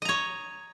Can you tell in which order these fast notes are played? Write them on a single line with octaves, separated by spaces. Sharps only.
D#5 A#5 C#5